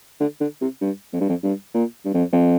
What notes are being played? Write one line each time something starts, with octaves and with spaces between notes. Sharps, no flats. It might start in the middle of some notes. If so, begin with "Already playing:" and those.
D3
D3
C3
G2
F2
G2
F2
G2
A#2
G2
F2
F2